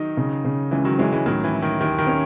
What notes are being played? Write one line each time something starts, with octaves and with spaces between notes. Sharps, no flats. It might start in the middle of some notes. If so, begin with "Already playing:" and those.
Already playing: D#3 F#3 D#4
C#3
C#3
C#2 E3
D#3 F#3
E3 G#3 C#4
E3 G#3
A2 D#3 F#3
E3
E4
D#3
D#2 D#3
D#3
C#4